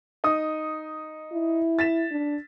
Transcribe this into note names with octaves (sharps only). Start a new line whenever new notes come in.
D#4 D#6
E4
A6 B6 E7
D4